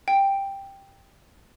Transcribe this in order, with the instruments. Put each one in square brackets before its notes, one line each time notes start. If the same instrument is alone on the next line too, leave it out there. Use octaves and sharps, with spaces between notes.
[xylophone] G5